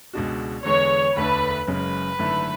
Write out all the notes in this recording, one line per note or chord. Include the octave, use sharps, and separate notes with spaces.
C#2 B2 G#3 D4 F#4
E2 D3 G#3 B3 C#5
E1 D2 D3 A3 D4 B4
F#1 F#2 C#3 G#3 C#4 B4
G#1 F#2 D3 A3 E4